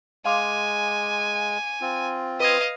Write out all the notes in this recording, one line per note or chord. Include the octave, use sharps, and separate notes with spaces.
G#3 F5 G#5 C6 D6
C4 F4
B4 D#5 F5 D#6 G#6